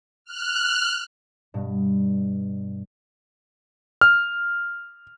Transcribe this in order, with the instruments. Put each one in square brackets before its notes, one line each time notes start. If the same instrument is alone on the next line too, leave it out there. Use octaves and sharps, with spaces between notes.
[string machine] F6 F#6
[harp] G2 B2
[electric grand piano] F6